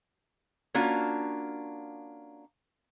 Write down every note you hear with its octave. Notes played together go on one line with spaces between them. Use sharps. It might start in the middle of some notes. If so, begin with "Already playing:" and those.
A#3 C#4 D4 F4 F#4